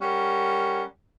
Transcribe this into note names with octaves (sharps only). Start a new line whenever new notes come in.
G3 C#4 A#4 F#5